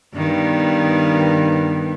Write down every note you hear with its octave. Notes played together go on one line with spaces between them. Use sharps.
G2 D#3 B3